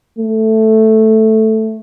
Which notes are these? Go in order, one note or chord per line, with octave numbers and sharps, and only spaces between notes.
A3